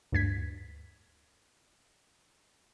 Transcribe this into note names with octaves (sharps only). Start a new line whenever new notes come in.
D2 G2 G#6 B6